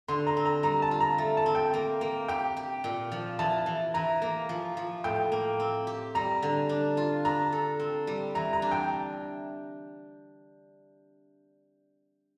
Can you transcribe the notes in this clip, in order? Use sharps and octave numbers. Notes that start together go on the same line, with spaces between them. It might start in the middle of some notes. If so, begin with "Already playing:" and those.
D3 C6
A#5
C4
A#5
G3 A#5
A5
F4
A#5
A3
A5
C4
G5
A#3
A#3
G4 G5
G4
A#2
F3
E3 A5
E3
E3 A#5
A#3
F3
F3
A2 G5
A#3
C4
G4
G3 A#5
D3
D4
F4
D4 A#5
A4
C4
G3
E3 A#5
A#5
D4
G5